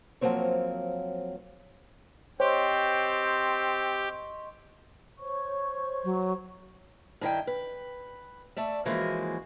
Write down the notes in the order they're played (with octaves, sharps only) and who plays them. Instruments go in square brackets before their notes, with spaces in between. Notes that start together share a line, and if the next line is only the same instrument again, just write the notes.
[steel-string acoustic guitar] F3 F#3 A#3 C4 C#5
[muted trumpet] C4 [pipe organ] G4 [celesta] C5 C#5 G5 [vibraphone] D#5 C6 C#6
[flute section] C5 C#5 C#6
[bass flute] F#3
[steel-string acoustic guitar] G2 D#3 E4 A#4 G5
B4
A3 D5 E5
E3 F3 G#3 A#3 C#4 F#4